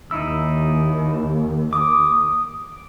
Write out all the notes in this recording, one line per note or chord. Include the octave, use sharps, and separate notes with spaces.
D#2 D#4 E4 E6
D6 D#6